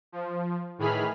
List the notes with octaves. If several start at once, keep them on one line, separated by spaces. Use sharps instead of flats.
F3
A2 D#3 E3 G#4 B5 F6